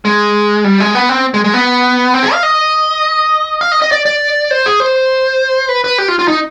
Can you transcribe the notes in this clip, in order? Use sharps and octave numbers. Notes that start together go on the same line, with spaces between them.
G#3
G3
G#3
B3
C4
G#3
G#3
B3
C4
G#4
F5
D#5
F5
D#5
D#5
D5
D5
C5
G#4
C5
B4
B4
G4
F4
F4
D#4